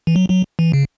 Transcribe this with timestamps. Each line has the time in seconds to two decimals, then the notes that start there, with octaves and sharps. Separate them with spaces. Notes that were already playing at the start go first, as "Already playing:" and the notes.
0.07 E3
0.16 F#3
0.30 F#3
0.59 E3
0.73 C#3